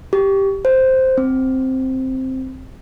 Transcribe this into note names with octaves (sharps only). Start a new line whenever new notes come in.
G4
C5
C4